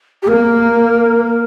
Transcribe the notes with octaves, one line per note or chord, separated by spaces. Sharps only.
G4
A#3 A#4
A#4